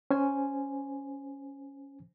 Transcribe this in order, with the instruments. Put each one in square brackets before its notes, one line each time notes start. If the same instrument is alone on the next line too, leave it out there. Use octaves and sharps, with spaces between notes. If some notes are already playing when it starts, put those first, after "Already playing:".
[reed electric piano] C#4 C5 G#5